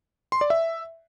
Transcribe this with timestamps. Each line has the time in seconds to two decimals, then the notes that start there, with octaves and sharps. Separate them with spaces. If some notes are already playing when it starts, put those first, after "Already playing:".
0.32 C6
0.41 D5
0.50 E5